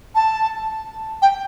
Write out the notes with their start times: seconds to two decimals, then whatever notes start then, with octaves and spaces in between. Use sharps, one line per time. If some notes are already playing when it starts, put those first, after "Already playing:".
0.15 A5
1.22 G5